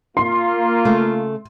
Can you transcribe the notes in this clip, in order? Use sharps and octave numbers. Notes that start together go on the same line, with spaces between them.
A#3 F4 C6
C#3 A3